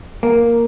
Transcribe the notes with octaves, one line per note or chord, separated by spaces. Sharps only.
A#3